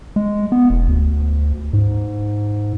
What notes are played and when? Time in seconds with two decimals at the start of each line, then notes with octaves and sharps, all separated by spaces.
0.16 G#3
0.52 B3
0.70 E1
0.88 D2
1.73 G#2